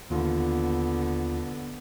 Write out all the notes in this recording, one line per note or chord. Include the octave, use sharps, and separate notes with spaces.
D#2 D3 B3 F4